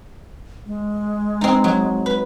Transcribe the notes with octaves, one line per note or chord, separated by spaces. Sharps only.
G#3
C4 D#4
F#3
B4